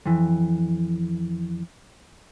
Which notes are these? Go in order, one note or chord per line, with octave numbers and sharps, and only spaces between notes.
F2 E3